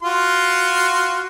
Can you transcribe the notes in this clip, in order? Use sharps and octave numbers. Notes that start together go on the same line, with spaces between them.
F4 F#4 C6